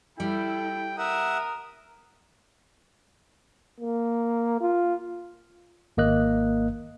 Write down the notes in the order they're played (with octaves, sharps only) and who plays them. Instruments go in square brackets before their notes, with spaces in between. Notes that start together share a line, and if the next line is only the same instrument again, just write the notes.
[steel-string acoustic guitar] G3 [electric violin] E4 A4 [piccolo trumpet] G5
[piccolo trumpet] A#4 [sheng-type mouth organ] E5 F#5 [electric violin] D#6
[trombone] A#3
F4
[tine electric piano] G#1 A#3 D#5 F#6